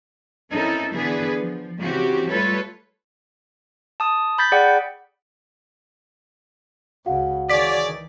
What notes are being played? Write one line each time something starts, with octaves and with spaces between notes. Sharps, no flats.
C4 C#4 D#4 E4 A4 A#4
D3 E3 B3 D4 G#4 B4
F3
C#3 E3 C4 F#4 G4
G3 A3 F4 A4 B4 C#5
A5 D#6
B5 G6 A6 B6
G#4 D5 F#5 G5
C#2 C#3 F#4 F5 F#5
D#3 E3 G#4 C#5 D5 B6